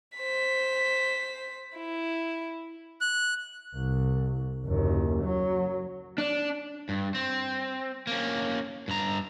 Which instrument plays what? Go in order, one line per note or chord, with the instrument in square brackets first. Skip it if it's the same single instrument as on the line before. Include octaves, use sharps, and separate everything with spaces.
[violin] C5 B6
E4
[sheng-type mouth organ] F#6
[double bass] C2
F#1 D#2
F#3
[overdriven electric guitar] D4
G2
C4
A#3 C#4
G2 A#5